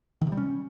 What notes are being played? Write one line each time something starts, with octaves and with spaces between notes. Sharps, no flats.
D#3
C3
G3
C#4